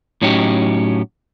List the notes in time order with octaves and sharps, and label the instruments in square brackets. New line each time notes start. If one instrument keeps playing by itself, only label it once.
[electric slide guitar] A2 F#3 C#4 D#4 G4